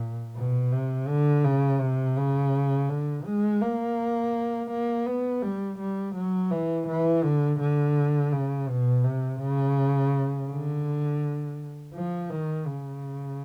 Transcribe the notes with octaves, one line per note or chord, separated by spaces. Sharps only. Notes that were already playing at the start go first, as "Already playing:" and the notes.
Already playing: A#2
B2
C3
D3
C#3
C3
C#3
D3
G#3
A#3
A#3
B3
G3
G3
F#3
E3
E3
D3
D3
C#3
B2
C3
C#3
D3
F3
D#3
C#3